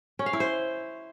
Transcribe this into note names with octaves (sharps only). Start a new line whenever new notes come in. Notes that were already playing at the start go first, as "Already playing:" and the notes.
C#4
F5
E4
C5